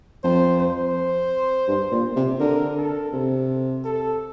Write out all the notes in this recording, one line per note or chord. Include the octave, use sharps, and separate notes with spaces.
F2 C5
C5
G2
A#2
C3
D3 A#4
A4
C3
A4